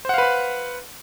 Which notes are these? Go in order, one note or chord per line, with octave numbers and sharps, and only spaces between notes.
B4 C5 F5 F#5 B5